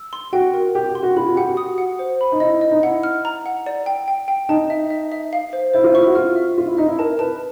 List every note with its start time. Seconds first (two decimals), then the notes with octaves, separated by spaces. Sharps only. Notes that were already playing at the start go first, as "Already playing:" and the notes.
Already playing: E6
0.13 C6
0.33 F#4 G5
0.54 A#4
0.75 G4 G5
0.89 G4
0.95 C6
1.03 F#4
1.17 F4 B5
1.26 F#4
1.36 G4 F#5
1.47 F#4
1.57 D#6
1.78 F#5
1.99 C5
2.21 B5
2.32 D#4
2.40 E4 D#5
2.61 D#5
2.71 D#4
2.83 E4 F#5
3.03 F6
3.25 A#5
3.46 F#5
3.66 D5
3.86 G5
4.08 G5
4.28 G5
4.49 D#4 A5
4.70 E5
4.90 E5
5.12 E5
5.33 F5
5.53 C5
5.74 E4 C5
5.84 F4
5.94 E4 C#6
6.07 F#4
6.15 F4 F6
6.36 E5
6.57 F4 E5
6.67 E4
6.77 D#4 E5
6.88 E4
6.99 A#4 A5
7.19 B4 A5